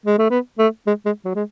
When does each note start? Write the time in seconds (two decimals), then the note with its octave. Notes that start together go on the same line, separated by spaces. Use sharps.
0.06 G#3
0.18 A3
0.30 B3
0.59 A3
0.87 G#3
1.06 G#3
1.25 F#3
1.35 G#3